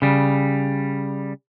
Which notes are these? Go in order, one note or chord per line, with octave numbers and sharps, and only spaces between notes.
C#3 G3